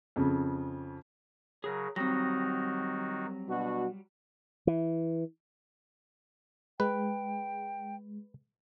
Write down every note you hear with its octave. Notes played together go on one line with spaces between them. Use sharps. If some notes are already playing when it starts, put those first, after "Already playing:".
F2 C#3
C#3 F#3 G#4 A#4
D#3 F#3 G3 C4 D#4 F#4 A#6
B2 D4 F#4
E3
G#3 B4 G5